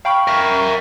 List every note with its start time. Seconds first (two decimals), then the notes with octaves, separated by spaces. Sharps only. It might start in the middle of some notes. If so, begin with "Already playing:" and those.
0.05 F5 G5 B5 C#6
0.28 A#4 E5